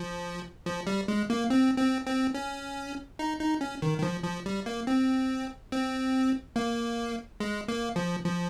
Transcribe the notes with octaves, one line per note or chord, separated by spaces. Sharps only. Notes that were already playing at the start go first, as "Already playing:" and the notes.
Already playing: F3
F3
G3
G#3
A#3
C4
C4
C4
C#4
D#4
D#4
C#4
D#3
D#3
F3
F3
G3
A#3
C4
C4
A#3
G#3
A#3
F3
F3